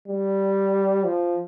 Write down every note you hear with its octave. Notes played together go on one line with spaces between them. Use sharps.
G3
F3